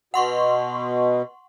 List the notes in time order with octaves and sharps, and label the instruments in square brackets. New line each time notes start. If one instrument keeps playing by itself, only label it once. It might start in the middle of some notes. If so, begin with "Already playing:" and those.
[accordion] B2 [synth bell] F#5 C6 C#6